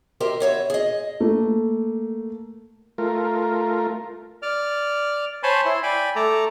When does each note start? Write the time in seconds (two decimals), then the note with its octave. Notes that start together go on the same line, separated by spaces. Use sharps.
0.20 G4 A#4 C5 D#5 E5
0.40 B3 C#5 E5
0.70 G#4 D#5
1.20 A3 A#3
2.98 A3 F4 A#4
4.42 D5 F6
5.43 C5 C#5 G#5 A5 B5 C6
5.65 E4 C6
5.83 D5 G5 G#5 B5
6.16 A3 A4 A#5 D6